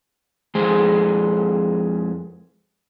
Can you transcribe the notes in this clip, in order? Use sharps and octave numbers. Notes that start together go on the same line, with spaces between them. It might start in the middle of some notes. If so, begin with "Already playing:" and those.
F2 G#3 G#4 C5